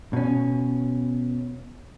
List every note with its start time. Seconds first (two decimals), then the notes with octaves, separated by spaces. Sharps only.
0.13 B2 C#4